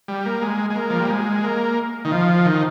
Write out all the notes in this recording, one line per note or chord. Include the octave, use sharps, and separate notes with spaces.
G3
A#3
G#3
G#3
A#3
F3
G3
G#3
A#3
D#3
F3
D#3